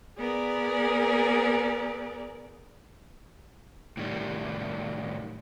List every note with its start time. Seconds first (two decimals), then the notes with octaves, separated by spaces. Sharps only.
0.18 B3 G#4 A#4 D5
3.97 A2 D#3 G3